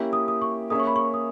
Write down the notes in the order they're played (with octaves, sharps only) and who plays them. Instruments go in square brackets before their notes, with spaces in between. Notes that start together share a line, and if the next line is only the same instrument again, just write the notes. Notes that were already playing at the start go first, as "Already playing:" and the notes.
Already playing: [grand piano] A#3 C#4 E4 G4
[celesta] D#6
D#6
C#6
[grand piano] A#3 C#4 G#4 C#5 E5 [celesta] D#6
[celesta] C#6
B5
C#6
D#6